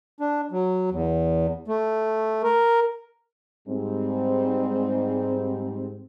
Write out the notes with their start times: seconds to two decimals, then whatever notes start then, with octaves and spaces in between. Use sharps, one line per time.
0.20 D4
0.52 F#3
0.91 E2
1.68 A3
2.44 A#4
3.68 G#2 G3 C4